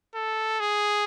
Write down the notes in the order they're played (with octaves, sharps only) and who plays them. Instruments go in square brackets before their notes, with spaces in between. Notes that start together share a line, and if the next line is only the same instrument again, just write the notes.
[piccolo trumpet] A4
G#4